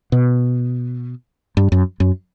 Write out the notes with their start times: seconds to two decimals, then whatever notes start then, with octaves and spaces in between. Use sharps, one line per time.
0.12 B2
1.57 G2
1.72 F#2
2.00 F#2